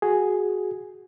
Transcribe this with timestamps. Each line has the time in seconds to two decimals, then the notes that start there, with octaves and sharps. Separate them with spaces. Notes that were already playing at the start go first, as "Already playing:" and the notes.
0.02 F#4 G#4